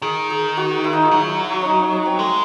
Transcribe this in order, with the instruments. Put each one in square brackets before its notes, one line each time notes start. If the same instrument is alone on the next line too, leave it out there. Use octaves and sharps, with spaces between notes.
[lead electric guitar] D#3 [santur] G#4
[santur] G#4
F#4
E4
D#4
E4
[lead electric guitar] F#3
[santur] C#4 D#4
D#4
C#4
C4
[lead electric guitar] G#3 [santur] A3